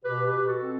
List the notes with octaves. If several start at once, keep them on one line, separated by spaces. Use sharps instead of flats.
B2 G4 B4
G4 B4
B2
F#4 A4
C4